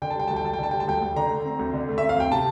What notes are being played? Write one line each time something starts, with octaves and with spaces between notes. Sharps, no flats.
D3 G5
A5
G3 G5
D2 A5
G5
D2 A5
G5
D3 A5
G3 G5
A5
D2 G5
D2
D3 A#5
A3
C4
D2
D3
A3
C4 E5
F5
D2 G5
C3 A5